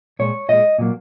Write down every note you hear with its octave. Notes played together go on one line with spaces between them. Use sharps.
A#2 G#3 C#5
A#2 G#3 D#5
A#2 F#3 A#3